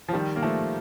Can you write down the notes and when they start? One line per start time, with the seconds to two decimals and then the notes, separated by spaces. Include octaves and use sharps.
0.08 F3
0.13 D#3 G3
0.36 A#3
0.43 F3 A3